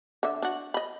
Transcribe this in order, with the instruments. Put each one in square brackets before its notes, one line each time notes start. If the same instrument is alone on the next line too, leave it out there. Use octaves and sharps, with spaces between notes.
[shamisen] D3 E5
D4 F#4
D#5 B5